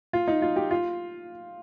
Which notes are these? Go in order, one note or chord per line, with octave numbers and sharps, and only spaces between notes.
F4
D#4
F4
G4
F4